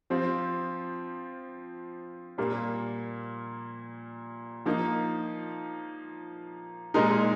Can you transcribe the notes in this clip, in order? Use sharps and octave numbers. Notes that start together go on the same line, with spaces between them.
F3 C4 F4
A#2 G3 A#3
F3 A#3 D#4
A#2 G#3 D#4 A#4